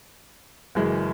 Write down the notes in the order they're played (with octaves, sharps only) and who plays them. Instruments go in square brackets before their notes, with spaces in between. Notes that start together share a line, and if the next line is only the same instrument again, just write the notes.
[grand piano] F#1 F#2 E3 G#3